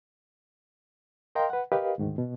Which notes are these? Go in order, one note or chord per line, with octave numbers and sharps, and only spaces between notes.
A#4 D#5 F5 G5 A#5 C6
B4 F#5
G4 A#4 B4 D#5 F5
D2 G#2 D#3
B2